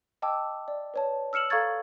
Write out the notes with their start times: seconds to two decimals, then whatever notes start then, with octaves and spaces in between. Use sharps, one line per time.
0.22 D#5 G5 A5 D6 E6
0.68 D5
0.94 B4 C#5 A5
1.33 E6 F6 C#7 E7 F#7
1.50 A4 F5 A#5 C#6 G#6 A6